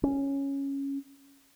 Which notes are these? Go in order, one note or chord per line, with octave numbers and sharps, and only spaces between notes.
C#4